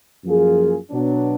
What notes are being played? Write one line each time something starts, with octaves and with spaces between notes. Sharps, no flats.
F#2 F3 A#3 F4 G#4
B2 F#3 B3 D4